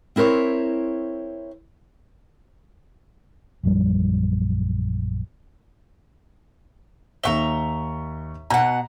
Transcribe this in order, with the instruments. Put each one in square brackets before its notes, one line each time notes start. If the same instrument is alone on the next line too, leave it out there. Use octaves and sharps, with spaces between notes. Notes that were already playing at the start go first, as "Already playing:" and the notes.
[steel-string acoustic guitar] C4 E4 A#4 C5 C#5
[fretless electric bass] A#1 F#2 F3 G3
[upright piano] D#2 C#6 G7 [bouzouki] E5 F#5 A#5
[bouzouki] B2 F#5 [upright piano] A#5